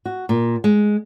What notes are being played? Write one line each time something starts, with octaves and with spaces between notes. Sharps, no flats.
F#4
A#2
G#3